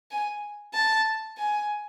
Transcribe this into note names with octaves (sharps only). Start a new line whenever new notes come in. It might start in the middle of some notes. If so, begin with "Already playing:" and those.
G#5
A5
G#5